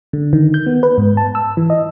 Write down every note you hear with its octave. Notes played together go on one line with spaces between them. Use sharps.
D3
D#3
G6
B3
B4
G#2
A5
E6
E3
D#5